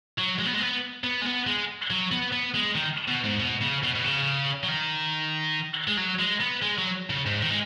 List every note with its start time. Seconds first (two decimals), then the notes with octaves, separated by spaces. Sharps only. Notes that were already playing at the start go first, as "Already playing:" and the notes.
0.19 F#3
0.39 G#3
0.46 B3
0.54 G#3
0.62 B3
1.04 B3
1.21 G#3
1.25 B3
1.47 G#3
1.90 F#3
2.11 B3
2.32 B3
2.54 G#3
2.75 D#3
3.08 B2
3.24 G#2
3.40 B2
3.61 C#3
3.83 B2
3.95 B2
4.04 C#3
4.63 F#3
4.68 D#3
5.88 G#3
5.97 F#3
6.19 G#3
6.40 B3
6.62 G#3
6.78 F#3
7.10 C#3
7.26 G#2
7.43 D#3
7.50 G#3